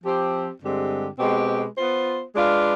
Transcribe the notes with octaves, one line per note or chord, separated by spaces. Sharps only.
F3 C4 G4 C5
G2 D3 G#3 C4 G4
B2 G#3 C4 G4 B4
B3 F4 C5
G#3 D4 F4 B4 F5